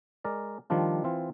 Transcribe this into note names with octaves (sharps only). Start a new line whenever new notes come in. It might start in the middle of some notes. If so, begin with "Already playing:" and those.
G#3 A#4 D5
D#3 F3 G3 D4 F4
E3 C4 F4